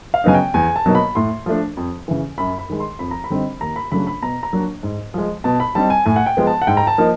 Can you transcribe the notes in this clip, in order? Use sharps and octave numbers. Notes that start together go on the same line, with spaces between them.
F5
C#3 F#3 B3 D#4 G#5
G5
E2 G#5
A5
B2 F#3 A#3 D#4
B5
A2 C6
F3 A3 D4
F2
C#3 E3
F#2 B5
B5
D#3 G#3
C6
F2 B5
A#5
B5
D3 G3 C4 D#4
D#2 A#5
B5
C#3 F#3 A3 D4 B5
B5
B2 A#5
A#5
F#3 A#3 D4
G#2
F3 G#3
B2 A5
B5
G3 C4 D#4 A5
G#5
A2 G#5
F#5
G5
F3 G#3 B3
A5
F#5
G#2 G5
A#5
A5
F3 A#3 D#4